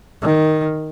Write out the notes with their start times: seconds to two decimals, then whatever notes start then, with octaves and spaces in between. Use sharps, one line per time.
0.22 D#3